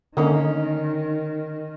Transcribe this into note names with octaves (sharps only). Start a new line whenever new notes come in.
D3 D#3 A#3 C#4 D#4